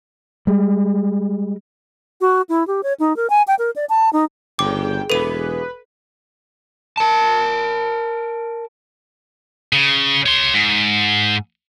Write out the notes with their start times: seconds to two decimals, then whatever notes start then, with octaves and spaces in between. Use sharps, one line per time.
0.47 G3 G#3
2.21 F#4
2.49 E4
2.67 G4
2.83 C#5
3.00 D#4
3.16 A#4
3.30 G#5
3.48 G5
3.59 A#4
3.76 D5
3.89 A5
4.13 D#4
4.59 G1 G#2 C#3 G5 D6
5.10 E1 E3 B3 G#4 A4 B4 D#7
6.97 A#4 A5
9.73 C#3
10.26 C#5 C6
10.54 G#2